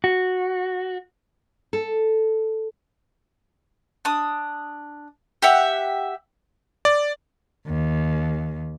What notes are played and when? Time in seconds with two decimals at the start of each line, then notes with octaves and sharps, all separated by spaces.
0.04 F#4
1.73 A4
4.05 D4 D#6
5.42 G4 E5 F#5
6.85 D5
7.67 D#2